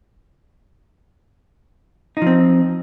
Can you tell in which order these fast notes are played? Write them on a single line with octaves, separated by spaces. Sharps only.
D#4 F3 C4